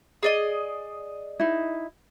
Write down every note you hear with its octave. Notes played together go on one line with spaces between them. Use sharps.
G#4 D5 D#5
D#4 E4